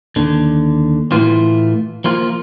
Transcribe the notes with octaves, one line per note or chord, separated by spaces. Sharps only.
D#2 D3
A2 E3 F4
F3 A#3 F4